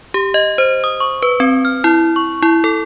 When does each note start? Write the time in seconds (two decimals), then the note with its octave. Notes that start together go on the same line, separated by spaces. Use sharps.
0.14 G4
0.34 D#5
0.58 C5
0.84 D#6
1.00 C#6
1.23 B4
1.40 C4
1.65 F6
1.84 E4
2.16 C#6
2.42 E4
2.64 A4